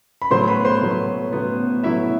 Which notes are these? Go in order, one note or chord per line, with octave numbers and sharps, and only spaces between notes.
B5
A2 F#3 B3 C5 C6
B4 B5
C5 C6
A2 F#3 B3
A2 F#3 B3
A2 F#3 B3 E4 E5